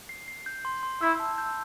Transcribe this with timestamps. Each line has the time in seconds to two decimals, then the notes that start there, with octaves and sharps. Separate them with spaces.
0.09 C7
0.28 C7
0.46 G6
0.65 C6
0.83 C6
1.01 E4 E6
1.20 A5
1.38 G6